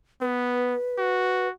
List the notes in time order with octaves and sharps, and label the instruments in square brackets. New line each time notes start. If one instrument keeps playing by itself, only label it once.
[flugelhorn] B3 [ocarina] B4
[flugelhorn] F#4